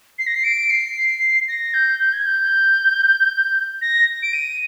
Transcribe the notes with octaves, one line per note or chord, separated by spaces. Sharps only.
C7
A#6
C7
D7
C7
A#6
G6
G6
G#6
G6
A#6
D7
D#7